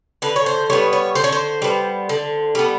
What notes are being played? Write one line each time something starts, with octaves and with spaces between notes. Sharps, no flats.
D3 B4
C#5
C5
G3 B3 C#5
C#5
D3 C5
C#5
C5
G3 B3
D3
G3 B3